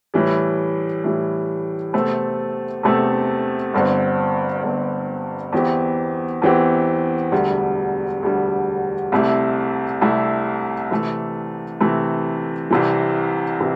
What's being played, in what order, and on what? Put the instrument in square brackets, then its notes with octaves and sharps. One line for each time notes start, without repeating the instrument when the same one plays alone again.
[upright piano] A2 E3 G3
A2 E3 G3
E2 C3 A3 C4 A4
E2 C3 A3 C4 A4
G1 G2 D3 C4
G1 G2 D3 C4
E2 E3 C4 G4
E2 E3 C4 G4
E1 D2 D3 G3
E1 D2 D3 G3
C2 C3 A3 E4
C2 C3 A3 E4
C3 E3 A3
C3 E3 A3
C2 C3 E3
C3 E3